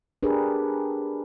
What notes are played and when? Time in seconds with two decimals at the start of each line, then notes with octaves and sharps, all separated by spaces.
0.23 D4 G4 G#4 A#4 B4